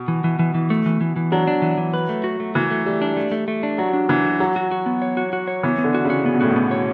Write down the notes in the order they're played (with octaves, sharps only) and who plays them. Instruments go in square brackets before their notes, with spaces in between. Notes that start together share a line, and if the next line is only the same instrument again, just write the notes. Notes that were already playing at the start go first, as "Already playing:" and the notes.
Already playing: [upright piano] B2
[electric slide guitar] E3
E3
E3
E3
A3
E3
E3
E3
[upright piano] F#3 [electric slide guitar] D4
[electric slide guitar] D4
E3
E3
B4
A3
F#4
A3
[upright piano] E3 [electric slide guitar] F#4
[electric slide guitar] A3
[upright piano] G3 [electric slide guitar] A3
[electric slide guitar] D4
A3
A3
A3
D4
[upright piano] F#3 [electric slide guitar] F#4
[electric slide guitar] D4
[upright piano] E3 [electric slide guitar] D4
[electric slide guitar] F#4
[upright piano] F#3 [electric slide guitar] F#4
[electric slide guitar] F#4
F#4
B3
C#5
F#4
F#4
C#5
[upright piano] E3 [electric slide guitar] B3
[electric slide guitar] B3
[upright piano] D3
[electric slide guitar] F#4
[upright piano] C#3
[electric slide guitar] F#4
[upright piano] C#3 [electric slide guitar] B3
[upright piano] B2
[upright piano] A2 [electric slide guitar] F#4
[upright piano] B2
[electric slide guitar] B3
C#5